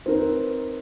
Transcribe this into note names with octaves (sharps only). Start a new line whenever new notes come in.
C4 D#4 A#4 B4